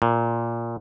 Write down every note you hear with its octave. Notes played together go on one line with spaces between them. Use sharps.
A#2